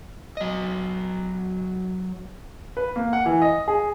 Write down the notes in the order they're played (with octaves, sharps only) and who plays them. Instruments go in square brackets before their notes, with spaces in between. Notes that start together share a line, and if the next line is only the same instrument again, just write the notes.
[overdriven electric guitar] F#3 D#5
[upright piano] B4
A#3
F#5
E3
D#5
G#4